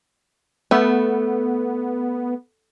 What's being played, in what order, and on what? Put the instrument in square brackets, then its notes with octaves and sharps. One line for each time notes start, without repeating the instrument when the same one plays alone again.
[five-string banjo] A3 [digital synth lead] B3